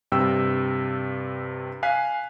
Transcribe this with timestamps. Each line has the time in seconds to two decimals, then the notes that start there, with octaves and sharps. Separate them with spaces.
0.12 G2 C3 G5 E6
1.83 F5 G#5 F#6 B6 C7